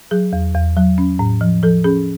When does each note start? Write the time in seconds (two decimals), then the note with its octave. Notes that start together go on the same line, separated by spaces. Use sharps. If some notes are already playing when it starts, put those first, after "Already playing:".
0.11 F#3 G#4
0.33 E2
0.54 E2
0.77 F#3
0.98 C#4
1.19 A2
1.41 F3
1.63 F3 A4
1.84 C#4 G#4